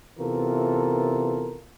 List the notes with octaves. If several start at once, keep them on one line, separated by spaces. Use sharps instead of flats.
C3 E3 B3 F4 A4 A#4